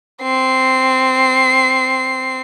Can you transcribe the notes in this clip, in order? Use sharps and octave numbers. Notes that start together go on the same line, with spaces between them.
C4 C7